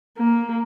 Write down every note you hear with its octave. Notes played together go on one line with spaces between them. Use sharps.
A#3